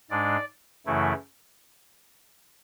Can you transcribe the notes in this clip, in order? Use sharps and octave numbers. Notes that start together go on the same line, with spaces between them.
G#2 G#3 D4 D5
F#2 C#3 E3 A3 E4